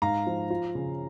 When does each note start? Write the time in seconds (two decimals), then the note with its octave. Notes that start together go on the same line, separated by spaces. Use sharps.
0.02 G#2 F5 A#5
0.27 F3
0.50 F4
0.75 C#3